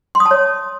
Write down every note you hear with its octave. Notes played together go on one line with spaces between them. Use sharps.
C6
D#6
A5
C#5